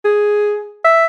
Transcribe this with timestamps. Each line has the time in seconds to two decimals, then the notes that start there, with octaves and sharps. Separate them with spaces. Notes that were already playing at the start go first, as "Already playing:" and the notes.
0.05 G#4
0.85 E5